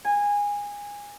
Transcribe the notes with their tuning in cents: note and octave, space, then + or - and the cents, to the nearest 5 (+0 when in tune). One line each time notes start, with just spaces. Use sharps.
G#5 -20